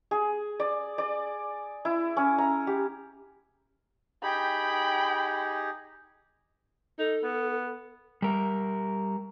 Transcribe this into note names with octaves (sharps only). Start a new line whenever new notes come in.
G#4
D5
D5
E4
C#4
A#5
G4
D#4 G4 G#4 G5 B5
D#4 A4
B3
G3 A#4